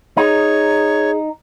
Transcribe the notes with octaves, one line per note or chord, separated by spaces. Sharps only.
D#4 G#4 C#5